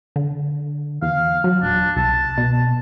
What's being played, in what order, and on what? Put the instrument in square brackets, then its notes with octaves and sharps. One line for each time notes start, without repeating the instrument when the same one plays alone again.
[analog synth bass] D3
[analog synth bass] E2 [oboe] F5
[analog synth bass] F#3
[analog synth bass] D#1 [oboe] D4
[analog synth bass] C2 [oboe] A5
[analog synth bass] B2